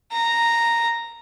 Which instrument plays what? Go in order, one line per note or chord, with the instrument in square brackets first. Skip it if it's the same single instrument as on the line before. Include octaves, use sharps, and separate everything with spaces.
[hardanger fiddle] A#5